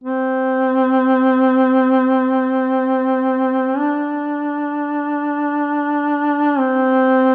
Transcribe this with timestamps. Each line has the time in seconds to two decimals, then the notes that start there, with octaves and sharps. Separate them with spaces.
0.04 C4
3.77 D4
6.59 C4